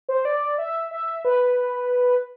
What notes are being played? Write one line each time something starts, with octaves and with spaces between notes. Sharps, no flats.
C5
D5
E5
E5
B4